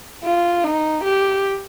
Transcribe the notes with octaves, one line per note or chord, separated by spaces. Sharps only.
F4
D#4
G4